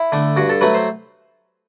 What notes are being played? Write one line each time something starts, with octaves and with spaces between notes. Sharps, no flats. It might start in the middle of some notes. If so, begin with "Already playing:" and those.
Already playing: E4
D3 A3
G2 F#4
A4
F#3 A3 B4
C5